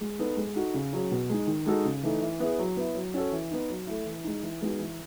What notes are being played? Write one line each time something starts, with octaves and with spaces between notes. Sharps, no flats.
G#3
B3 D#4 A4
G#3
D#4 F#4 A4
C#3
F#3 C#4 G#4
B2
G#3 D#4
D#3
G#3 D#4 F#4 A4
C#3
E3 A3 D#4
E3
B3 E4 G#4
F#3
B3 E4
F#3
C#4 F#4 A4
E3
B3 D#4
F#3
A3 E4
E3
G#3 D#4
E3
G#3 B3 D#4 F#4
E3